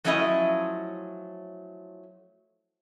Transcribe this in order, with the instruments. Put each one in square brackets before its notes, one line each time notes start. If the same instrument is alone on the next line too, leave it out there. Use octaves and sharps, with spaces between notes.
[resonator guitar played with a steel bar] F3 F#3 A3 C#4 E4 D#5